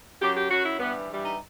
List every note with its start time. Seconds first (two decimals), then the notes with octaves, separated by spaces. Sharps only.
0.20 F#2 F#3 G4
0.35 G4
0.50 F#2 F#3 F#4
0.64 E4
0.79 G2 E3 G3 B3
1.09 G2 E3 G3
1.23 D#4